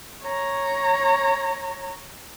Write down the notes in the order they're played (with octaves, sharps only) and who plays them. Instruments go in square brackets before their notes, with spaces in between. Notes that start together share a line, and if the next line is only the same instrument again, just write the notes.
[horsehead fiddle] C#5 A#5